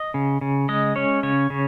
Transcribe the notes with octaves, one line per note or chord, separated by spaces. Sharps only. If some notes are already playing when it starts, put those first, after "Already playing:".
Already playing: D#5
C#3
C#3
G#3 D#5
C#4 C#5
C#3 C#5
C#3